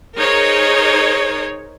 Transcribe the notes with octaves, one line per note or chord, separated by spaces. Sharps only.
D#4 G#4 A#4 C5 C#5